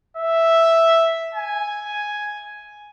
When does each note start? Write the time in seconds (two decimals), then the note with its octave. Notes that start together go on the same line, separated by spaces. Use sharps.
0.17 E5
1.35 G#5